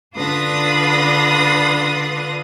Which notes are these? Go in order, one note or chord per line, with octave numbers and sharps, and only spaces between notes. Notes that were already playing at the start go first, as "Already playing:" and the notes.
D3 D4 F4 B4 D#6 A#6